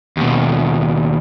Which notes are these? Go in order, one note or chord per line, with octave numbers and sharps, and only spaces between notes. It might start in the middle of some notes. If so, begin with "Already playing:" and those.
D#2 B2